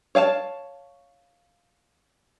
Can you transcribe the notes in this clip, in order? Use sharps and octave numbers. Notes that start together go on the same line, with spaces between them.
C#5 F5 G#5 A5